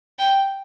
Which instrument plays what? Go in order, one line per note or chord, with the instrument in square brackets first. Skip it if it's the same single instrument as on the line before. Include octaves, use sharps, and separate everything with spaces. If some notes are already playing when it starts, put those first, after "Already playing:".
[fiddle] G5